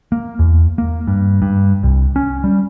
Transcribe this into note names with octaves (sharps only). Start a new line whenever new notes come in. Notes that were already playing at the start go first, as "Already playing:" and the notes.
A#3
E2
A#3
G2
G2
C2
C#4
G3